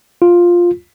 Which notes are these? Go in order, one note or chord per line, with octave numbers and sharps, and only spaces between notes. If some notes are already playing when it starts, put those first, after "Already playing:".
F4